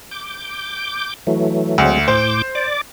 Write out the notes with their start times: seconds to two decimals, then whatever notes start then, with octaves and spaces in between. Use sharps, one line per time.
0.11 D6 G6
1.27 E3 F#3 A3
1.78 D2 F#3 G#3 C4
2.08 A2 C5 D6 G6
2.55 D5 D6